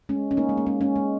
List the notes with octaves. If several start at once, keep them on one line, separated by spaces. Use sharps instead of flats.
G#3 C#4
C#4
A#3 D#4
G#3
A#3
G#3 C#4
G#3 C#4
G#3